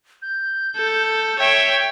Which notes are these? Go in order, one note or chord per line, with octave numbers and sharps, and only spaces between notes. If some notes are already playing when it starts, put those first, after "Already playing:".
G6
A4
C#5 E5 G5